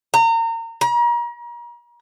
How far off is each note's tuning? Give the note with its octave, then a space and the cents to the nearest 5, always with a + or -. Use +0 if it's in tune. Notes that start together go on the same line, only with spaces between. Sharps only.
A#5 -30
A#5 +40